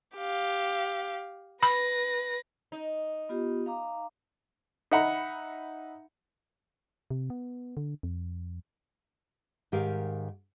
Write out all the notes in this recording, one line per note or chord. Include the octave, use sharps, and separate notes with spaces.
G4 F5
B4 B5 A#6
D#4
B3 F4 G4
F5 A#5 D6
D#4 E5 F#5 A#5 B5
C3
B3
D3
F2
G#2 D#3 G4 A#4 F5